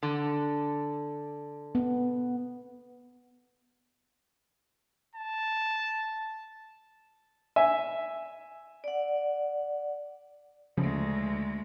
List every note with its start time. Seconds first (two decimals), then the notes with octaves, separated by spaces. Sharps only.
0.03 D3
1.75 B3
5.15 A5
7.56 E5 G#5
8.84 D5 F#5
10.78 D2 C#3 F3 G#3